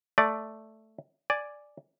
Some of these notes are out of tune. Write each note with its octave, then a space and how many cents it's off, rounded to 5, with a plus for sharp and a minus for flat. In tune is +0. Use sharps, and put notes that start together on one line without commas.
A3 +0 D5 +0
D5 +0 G#5 +0